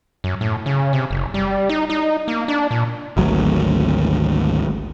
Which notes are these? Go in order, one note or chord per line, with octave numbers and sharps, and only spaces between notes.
F#2
A2
C#3
C3
F#1
G3
D#4
D#4
A#3
D4
A#2
G#1 D2 F#3